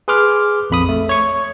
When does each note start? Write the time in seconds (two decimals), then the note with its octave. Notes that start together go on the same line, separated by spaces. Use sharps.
0.08 G#4 B4 C6 D6 F6
0.70 A#1 F2 B5 D#6
0.89 A3
1.09 C#5 C#6